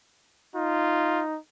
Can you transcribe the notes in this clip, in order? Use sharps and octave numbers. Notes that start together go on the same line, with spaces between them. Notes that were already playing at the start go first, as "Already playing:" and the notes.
D#4 F4